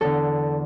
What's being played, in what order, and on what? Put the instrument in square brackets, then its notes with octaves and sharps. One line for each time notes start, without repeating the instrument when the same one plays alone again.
[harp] E2 D3 A4